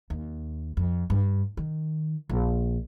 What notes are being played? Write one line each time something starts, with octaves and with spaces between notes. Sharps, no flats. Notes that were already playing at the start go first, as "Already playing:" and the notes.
D#2
F2
G2
D#3
A#1